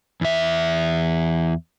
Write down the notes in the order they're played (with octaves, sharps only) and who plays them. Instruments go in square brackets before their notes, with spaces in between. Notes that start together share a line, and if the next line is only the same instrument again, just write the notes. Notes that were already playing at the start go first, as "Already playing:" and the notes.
[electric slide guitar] E2 E5